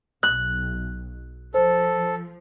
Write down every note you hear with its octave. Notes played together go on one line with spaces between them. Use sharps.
B1 F#6
F3 A4 C5